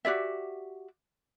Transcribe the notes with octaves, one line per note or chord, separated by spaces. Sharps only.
F#4 G4 D5 E5